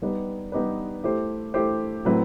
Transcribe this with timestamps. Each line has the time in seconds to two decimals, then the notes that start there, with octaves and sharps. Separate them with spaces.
0.02 G3 B3 D#4 G4 B4
0.52 G3 B3 D#4 G4 B4
1.04 A3 E4 G4 C5
1.54 A3 E4 G4 C5
2.05 A2 F#3 C4 E4 B4